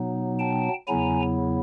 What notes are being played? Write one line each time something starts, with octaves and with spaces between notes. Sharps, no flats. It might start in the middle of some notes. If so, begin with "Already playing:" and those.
Already playing: B2 F#3 B3 D#4
G5 A5
E2 C#3 F#3 B3 E4 G#5 A#5